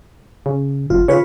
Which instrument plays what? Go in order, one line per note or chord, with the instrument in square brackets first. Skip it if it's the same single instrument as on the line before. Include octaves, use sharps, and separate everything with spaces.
[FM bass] C#3
[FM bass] F#1 [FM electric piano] F4
[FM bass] C#3 [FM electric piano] F4 B4 C#5